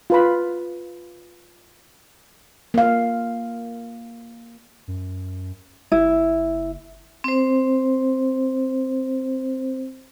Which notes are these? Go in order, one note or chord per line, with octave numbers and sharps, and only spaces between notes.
F4 B4 B5
A#3 F5
F#2
F#1 E4
C4 C5